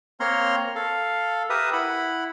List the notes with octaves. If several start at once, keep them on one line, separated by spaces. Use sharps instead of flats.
A#3 C4 C#5 A#5 C6 F6
A4 F5
G4 A#4 B4 E5 D#6
E4 F#5 B5